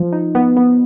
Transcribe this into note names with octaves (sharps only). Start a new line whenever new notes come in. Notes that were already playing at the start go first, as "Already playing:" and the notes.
Already playing: F3
D#4
B3
B3